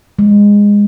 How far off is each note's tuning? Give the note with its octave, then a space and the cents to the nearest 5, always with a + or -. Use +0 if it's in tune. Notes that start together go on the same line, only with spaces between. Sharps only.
G#3 -20